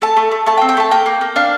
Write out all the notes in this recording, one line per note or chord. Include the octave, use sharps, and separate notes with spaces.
A3 A5
A3
A3
A3 A5
G5
C4
G5
A3 A5
A#3 G5
A#3
A#3
D4 F5